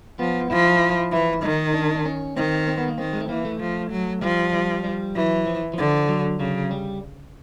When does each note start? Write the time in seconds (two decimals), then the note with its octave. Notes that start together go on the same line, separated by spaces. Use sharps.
0.19 F3 B3
0.50 F3 E4
0.65 E4
1.11 E3 E4
1.43 D#3 D#4
1.74 D4
1.96 D4
2.05 C#4
2.36 D#3 C4
2.67 C4
2.78 B3
2.88 A#3
2.98 D#3 C4
3.13 G#3
3.21 A3
3.29 E3 A#3
3.45 A3
3.60 F3
3.91 F#3
4.22 F3 G3
4.53 G3
4.84 G3
5.15 E3 F#3
5.46 F3
5.74 D3 F3
6.09 F#3
6.39 C#3 F#3
6.71 G3